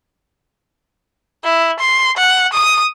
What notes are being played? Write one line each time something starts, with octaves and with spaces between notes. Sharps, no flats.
E4
C6
F#5
D#6